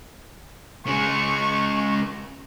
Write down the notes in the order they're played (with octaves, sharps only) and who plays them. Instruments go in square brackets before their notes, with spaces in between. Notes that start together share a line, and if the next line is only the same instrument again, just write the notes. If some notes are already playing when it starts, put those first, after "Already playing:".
[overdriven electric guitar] C#3 G#3 [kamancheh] C#6